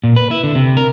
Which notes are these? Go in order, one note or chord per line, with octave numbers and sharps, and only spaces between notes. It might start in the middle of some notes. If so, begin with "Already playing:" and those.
A#2
B4
E4
D3
C3
A#4